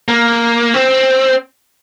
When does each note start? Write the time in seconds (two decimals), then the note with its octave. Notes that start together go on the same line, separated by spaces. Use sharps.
0.08 A#3
0.74 C4